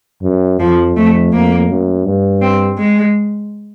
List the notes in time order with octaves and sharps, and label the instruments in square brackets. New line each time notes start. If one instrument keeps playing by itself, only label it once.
[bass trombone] F#2
[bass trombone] F2 [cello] F3
[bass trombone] F2 [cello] A3
[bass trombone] F2 [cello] A#3
[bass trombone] F#2
G2
[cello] C4
G#3